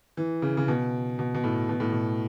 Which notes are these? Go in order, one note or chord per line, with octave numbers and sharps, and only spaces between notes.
E3
C#3
C#3
B2
B2
B2
A2
B2
A2
B2